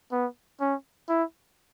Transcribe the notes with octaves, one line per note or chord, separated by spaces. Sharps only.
B3
C#4
E4